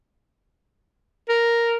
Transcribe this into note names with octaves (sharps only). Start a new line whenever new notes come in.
A#4